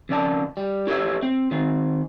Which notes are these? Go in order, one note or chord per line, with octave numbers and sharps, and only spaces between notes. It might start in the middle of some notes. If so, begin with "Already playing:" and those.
F2 C#3 D5 A5
G3
E4 G4 A4 C#5 E5
C4
D#3 C4